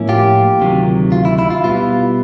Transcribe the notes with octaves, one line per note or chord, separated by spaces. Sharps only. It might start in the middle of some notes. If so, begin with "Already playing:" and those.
Already playing: A2 F3 A#3 C#4 E4
F4 G4
D2 C3 D#3 F#3
F4
E4
E4
F4
B2 G3 B3 E4 F4